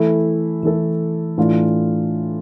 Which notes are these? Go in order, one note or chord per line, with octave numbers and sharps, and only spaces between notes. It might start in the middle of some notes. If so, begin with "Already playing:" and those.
Already playing: E3 A3 E4 A4
E3 A3 E4 A4
A2 E3 A3 D4 F4